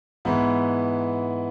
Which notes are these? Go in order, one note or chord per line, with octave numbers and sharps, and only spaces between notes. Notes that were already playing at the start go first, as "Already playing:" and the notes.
G#2 E3 B3 E4